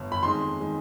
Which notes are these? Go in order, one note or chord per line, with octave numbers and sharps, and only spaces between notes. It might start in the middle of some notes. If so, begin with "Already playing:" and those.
Already playing: G1
B5
F2 D#3 G#3 C6
D#3 G#3